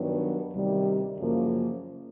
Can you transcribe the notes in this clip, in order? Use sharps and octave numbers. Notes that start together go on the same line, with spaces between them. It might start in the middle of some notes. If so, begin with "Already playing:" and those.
Already playing: G2 D#3 F#3 B3 D4
D2 C3 D#3 G3
F#2 C#3 F3 A#3